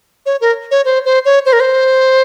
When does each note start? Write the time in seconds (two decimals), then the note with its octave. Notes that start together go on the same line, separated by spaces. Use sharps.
0.26 C#5
0.41 A#4
0.71 C#5
0.85 C5
1.05 C5
1.25 C#5
1.46 C5
1.53 A#4
1.60 C5